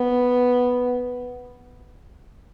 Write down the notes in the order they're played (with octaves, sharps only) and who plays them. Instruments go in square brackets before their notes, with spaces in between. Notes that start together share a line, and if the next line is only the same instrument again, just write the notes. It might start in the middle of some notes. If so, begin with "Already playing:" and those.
Already playing: [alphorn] B3